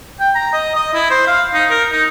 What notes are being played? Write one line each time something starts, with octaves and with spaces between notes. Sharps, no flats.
G5
A#5
D#5
D#5
E4
C5
F5
D#4
A#4
D#4